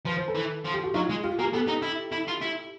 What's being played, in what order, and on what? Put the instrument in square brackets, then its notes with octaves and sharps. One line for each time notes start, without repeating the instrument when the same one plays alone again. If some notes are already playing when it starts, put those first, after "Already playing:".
[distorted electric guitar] F3 [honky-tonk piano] B4
[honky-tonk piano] C5
A4 B4
[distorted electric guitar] E3
F3
[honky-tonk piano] G4
F#4
[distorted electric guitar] F#3 [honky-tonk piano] D#4 F4
[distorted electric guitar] G#3
[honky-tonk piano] F4 G4
[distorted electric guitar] A#3 [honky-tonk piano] F#4 G#4
[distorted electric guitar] B3 [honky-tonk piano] G4 A4
[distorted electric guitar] D#4
E4
E4
F4
E4